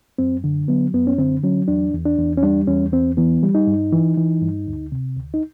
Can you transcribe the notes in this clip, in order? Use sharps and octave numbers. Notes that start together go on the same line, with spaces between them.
F#2 C4
D3
F#3 B3
F#2 B3
C#4
D3 C4
F#3 C#4
E2 D4
E2
D4
E2
C#4
G3 D4
E2 C#4
E2 C4
E3 B3
G3
D#4
G2
E3
E3
G2
D2
C3
D2
D#4